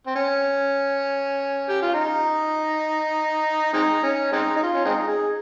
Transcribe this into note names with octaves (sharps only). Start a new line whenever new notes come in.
C4
C#4
G4
F4
D#4
G#3 C4 D#4
C#4
G#3 C4 D#4
D#4
F4
C#4
G#3 C4 D#4
G#4